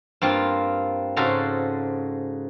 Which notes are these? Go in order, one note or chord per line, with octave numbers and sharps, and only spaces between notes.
G2 A#3 C4 F4
G#2 C#3 F#4 A4 C5 A#5